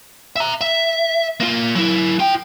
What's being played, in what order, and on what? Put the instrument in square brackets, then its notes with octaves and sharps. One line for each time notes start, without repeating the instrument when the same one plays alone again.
[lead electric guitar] E5 A#5
E5
A#3 F4
F#3 E4
F4 G5